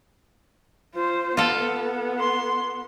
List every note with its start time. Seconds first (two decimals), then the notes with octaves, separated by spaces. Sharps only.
0.95 F4 C5
1.37 B3 F4 A4
2.19 C6